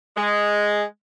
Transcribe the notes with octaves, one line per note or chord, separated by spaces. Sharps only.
G#3